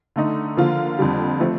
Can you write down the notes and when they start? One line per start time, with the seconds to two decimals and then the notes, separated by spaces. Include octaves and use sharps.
0.16 D3 A3 D#4
0.57 D3 F3 A#3 F4
0.99 F2 D3 G3
1.40 F3 A3 C4